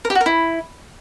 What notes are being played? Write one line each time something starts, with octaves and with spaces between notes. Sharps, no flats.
A#4
G4
F#4
A#4
E4